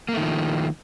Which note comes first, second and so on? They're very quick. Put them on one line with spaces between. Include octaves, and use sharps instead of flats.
A#3 A3 D#3 F3